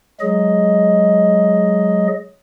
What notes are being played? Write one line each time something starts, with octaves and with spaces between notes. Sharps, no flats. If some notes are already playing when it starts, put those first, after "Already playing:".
F#3 G#3 G#4 D#5